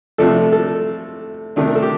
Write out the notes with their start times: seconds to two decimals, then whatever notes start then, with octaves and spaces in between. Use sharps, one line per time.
0.18 C3 F3 A3 D4 A4
0.52 A4
1.56 C3 D#3 A3 D4
1.68 A#4
1.75 A4
1.82 G4